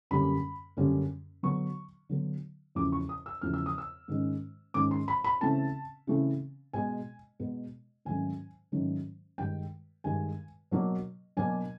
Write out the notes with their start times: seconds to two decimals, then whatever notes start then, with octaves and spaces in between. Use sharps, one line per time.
0.11 F#2 D3 G3 A#3 C#4 B5
0.77 F#2 D3 G3 A#3 C#4
1.43 D3 F#3 B3 C#6
2.09 D3 F#3 B3
2.75 E2 C#3 F3 A3 C#4 D6
2.92 C#6
3.09 D#6
3.26 E6
3.41 E2 C#3 F3 A3 C#4 F6
3.54 E6
3.66 D#6
3.78 E6
4.08 G#2 D#3 G#3 C#4
4.74 G#2 D#3 G#3 C#4 D6
4.91 C6
5.08 B5
5.24 B5
5.41 C#3 E3 A3 C4 A5
6.07 C#3 E3 A3 C4
6.73 B2 G#3 B3 G#5
7.39 B2 G#3 B3
8.05 G#2 D#3 F#3 A3 C#4 G#5
8.72 G#2 D#3 F#3 A3 C#4
9.38 G2 D#3 G#3 G5
10.04 G2 D#3 G#3 G#5
10.71 B2 F#3 A#3 D4
11.37 B2 F#3 A#3 D4 G#5